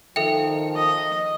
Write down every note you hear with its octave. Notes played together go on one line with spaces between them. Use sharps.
D#3 F3 A4 E5 G5
D#5